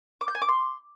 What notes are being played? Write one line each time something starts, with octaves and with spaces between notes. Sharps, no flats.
D6
G6
G#5
D6
C6